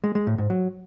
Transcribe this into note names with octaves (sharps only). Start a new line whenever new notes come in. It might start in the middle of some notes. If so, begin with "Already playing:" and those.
G#3
G#3
A2
G#2
F#3